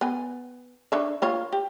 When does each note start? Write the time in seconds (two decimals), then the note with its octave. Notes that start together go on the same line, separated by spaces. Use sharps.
0.01 B3 G#5
0.92 D4 C#5 E5
1.22 A#3 F4 C#5
1.53 G4